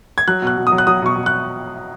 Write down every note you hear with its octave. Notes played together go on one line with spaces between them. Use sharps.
G#6
F#3 F#6
B2 F#6
B2
D#6
F#3
F#6
F#3 D#6
B2 C#6
B2
F#6